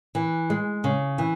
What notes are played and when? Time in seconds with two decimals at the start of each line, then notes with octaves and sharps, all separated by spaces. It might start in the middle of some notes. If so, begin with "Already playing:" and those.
0.15 E3
0.50 G#3
0.84 C#3
1.18 E3